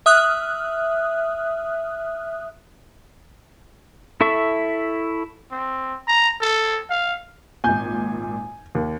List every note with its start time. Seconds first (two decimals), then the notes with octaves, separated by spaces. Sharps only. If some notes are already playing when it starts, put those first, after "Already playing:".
0.06 E5 D#6 F6 F#6
4.21 E4 A4 E5 C#6
5.51 C4
6.07 A#5
6.41 A4
6.90 F5
7.64 G#1 A#2 G#5 G6
8.75 D#2 G4